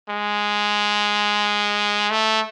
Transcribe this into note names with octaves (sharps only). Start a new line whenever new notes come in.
G#3
A3